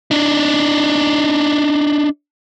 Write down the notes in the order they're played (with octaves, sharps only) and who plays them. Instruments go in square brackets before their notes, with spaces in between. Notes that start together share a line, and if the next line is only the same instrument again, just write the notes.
[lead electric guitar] D4 D#4